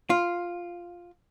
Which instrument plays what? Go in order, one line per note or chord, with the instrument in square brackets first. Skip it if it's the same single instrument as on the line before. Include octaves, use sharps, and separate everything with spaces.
[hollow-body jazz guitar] F4